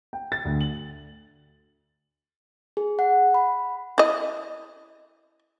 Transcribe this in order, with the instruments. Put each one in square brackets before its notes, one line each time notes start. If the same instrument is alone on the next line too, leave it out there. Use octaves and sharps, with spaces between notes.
[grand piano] G5
A6
D2
F#7
[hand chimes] G#4
F#5
B5
[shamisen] E4 D#5